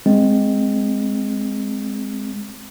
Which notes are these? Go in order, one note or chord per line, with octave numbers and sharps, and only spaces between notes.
G#3 C4